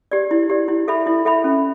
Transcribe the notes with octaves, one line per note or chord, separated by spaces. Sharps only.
G4 D5
E4
G4 D5
E4
A4 E5 B5
E4
A4 E5 B5
C#4